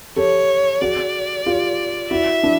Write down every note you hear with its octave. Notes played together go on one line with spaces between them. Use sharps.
G4 A4 C#5
F#4 G#4 D5
F4 G4
E4 F#4 E5
D4 E4